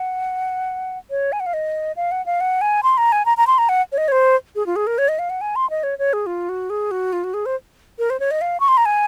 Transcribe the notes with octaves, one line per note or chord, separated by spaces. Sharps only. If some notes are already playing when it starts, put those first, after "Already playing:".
Already playing: F#5
C#5
G#5
F#5
F5
D#5
F5
F#5
F5
F#5
G#5
C6
A#5
G#5
A#5
A#5
C6
A#5
F#5
C#5
D#5
C#5
C5
G#4
F4
G#4
A#4
C#5
D#5
F5
F#5
G#5
C6
D#5
C#5
C#5
G#4
F4
F#4
G#4
F#4
F4
F#4
G#4
C5
A#4
C5
C#5
D#5
F5
C#6
C6
A#5
G#5